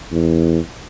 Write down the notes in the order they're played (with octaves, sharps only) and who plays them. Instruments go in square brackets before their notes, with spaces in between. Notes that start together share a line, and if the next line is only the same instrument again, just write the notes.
[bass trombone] E2